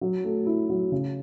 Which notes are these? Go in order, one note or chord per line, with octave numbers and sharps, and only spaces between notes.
F#3
A3
E4
F#3
C#3